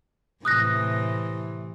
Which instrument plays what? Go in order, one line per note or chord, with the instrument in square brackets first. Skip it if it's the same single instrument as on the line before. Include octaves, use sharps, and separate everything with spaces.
[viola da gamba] A2 C3 E3 [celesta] D#6 F#6 A#6